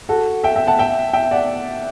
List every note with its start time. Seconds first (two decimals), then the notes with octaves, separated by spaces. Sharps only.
0.09 F#4 A4
0.44 E5 G5
0.56 E5 G5
0.67 F#5 A5
0.79 E5 G5
1.13 E5 G5
1.31 D5 F#5